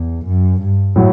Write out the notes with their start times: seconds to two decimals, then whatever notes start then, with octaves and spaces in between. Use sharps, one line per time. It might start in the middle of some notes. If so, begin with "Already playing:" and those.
Already playing: E2
0.25 F#2
0.61 G2
0.96 A2 F#3